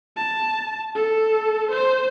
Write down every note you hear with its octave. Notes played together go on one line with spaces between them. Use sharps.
A5
A4
C5